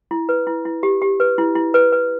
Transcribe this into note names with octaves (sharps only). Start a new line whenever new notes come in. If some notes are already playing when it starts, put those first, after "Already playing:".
E4
B4
E4
E4
G4
G4
B4
E4
E4
B4
B4